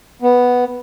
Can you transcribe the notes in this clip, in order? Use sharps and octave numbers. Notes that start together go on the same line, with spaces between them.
B3